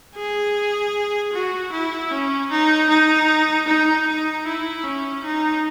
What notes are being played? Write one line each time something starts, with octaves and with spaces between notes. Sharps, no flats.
G#4
F#4
E4
C#4
D#4
D#4
D#4
D#4
E4
C#4
D#4